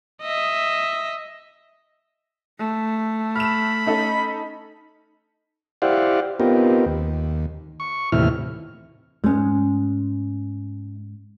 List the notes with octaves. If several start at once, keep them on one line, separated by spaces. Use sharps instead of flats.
D#5 E5
A3
B5 F6 E7
C#4 D#4 A4
E4 G4 C5 D5 F5 F#5
B3 C4 D#4 F4 G4 A#4
D#2
C#6
D#2 A2 C3 E3 E4 F6
G#2 G#3 C#4